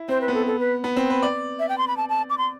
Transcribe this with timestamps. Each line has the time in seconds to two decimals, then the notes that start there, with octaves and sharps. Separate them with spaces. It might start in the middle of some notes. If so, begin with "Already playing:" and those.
Already playing: E4
0.09 C4 C5
0.21 B4
0.28 B3
0.34 A4
0.46 A4
0.60 B4
0.84 B3
0.96 C4
1.10 B4
1.22 D5
1.59 E5
1.69 G5
1.78 C6
1.88 B5
1.97 A5
2.09 A5
2.30 D6
2.38 C6